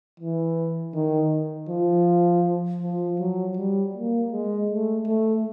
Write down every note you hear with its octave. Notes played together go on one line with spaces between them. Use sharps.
E3
D#3
F3
F3
F#3
G3
A#3
G#3
A3
A3